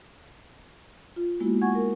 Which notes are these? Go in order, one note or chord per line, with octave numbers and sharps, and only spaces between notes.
F4
G#3 A#3 B3 E4 F#4
F#5 G#5 C#6 G#6
A#4